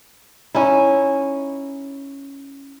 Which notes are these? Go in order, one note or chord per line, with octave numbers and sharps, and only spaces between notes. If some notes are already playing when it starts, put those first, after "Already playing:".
C#4 D#4 E4